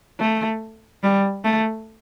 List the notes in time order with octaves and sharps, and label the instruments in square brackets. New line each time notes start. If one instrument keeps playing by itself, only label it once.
[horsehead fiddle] A3
G3
A3